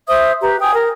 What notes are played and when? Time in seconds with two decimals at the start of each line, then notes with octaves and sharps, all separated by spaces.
0.07 C5 E5 D#6
0.42 G4 B4 A#5
0.60 G5 G#5 D#6
0.74 A#4